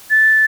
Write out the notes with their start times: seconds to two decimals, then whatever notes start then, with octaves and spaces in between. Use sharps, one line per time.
0.10 A6